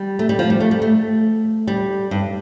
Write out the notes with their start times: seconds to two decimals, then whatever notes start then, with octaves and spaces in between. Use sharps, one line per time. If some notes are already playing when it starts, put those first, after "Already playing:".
Already playing: G3
0.19 A3
0.29 G3
0.39 F3
0.50 G3
0.60 A3
0.71 G3
0.82 A3
1.67 G3
2.11 G2